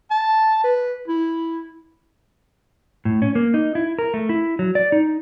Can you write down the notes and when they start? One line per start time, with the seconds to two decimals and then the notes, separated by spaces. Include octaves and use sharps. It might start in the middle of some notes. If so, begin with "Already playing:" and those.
0.10 A5
0.64 B4
1.07 E4
3.05 A2
3.22 C#4
3.35 A#3
3.54 D#4
3.75 E4
3.99 A#4
4.14 A3
4.29 E4
4.59 F#3
4.75 D5
4.92 D#4